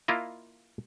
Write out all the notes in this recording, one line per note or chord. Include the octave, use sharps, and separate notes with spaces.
A#3 E4 F4 D#5